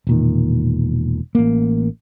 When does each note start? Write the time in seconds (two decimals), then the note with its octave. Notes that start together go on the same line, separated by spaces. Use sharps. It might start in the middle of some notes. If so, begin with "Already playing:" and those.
0.07 E1 A#2 D#3
1.35 A1 A#3